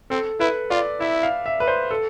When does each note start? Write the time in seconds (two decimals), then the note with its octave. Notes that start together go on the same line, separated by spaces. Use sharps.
0.10 C4 A4
0.40 E4 B4
0.70 F4 D5
1.00 E4 E5
1.23 F5
1.46 E5
1.60 B4
1.68 C5
1.91 A4